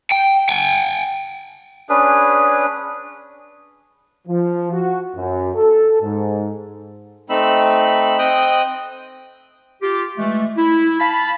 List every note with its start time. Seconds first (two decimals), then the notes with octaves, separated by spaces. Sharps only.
0.11 G5
0.49 G5 G#5
1.89 C#4 D4 G#4 B4
4.28 F3
4.71 F#4
5.15 F#2
5.55 A4
6.02 G#2
7.30 A3 C4 D#4 B5 E6
8.19 C4 D#5 G5 D#6 F#6 G6
9.82 F4 G4
10.18 E3 G#3 A3
10.58 E4
11.00 F5 A5 B5